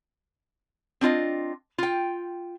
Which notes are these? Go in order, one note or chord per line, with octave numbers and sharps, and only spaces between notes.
C4 D4 F4 D#5
F4 G5